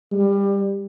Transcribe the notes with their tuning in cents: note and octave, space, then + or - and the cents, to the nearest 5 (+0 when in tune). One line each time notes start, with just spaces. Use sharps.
G3 +25